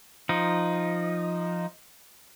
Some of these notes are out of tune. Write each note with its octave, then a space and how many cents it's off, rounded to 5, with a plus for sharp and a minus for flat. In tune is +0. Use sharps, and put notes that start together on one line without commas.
F3 +0 D#4 +0